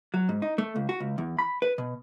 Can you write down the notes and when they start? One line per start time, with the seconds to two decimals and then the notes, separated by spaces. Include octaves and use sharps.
0.14 F#3
0.29 G#2
0.42 D#4
0.58 A3
0.76 C#2
0.89 F#4
1.00 C#2
1.18 E2
1.39 B5
1.62 B4
1.78 B2